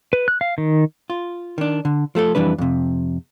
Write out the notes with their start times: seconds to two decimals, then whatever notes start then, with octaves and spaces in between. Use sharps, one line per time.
0.13 B4
0.28 F#6
0.41 F5
0.58 D#3
1.10 F4
1.58 D#3 D4
1.85 D3
2.15 F3 A3 G#4 A4
2.35 F2 E3 G3 D4 B4
2.58 F2 C3